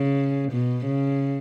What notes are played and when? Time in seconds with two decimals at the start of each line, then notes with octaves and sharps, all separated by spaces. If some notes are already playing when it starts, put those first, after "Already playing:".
Already playing: C#3
0.52 B2
0.86 C#3